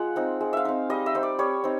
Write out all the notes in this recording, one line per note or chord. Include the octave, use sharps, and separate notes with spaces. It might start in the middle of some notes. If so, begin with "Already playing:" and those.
Already playing: G#3 F4 F#5
C4 D#4
G#3
E5 F5
C4 D#4
G3 D#5
E5
C4 D#4
D5
G3 C#5
C4 D#4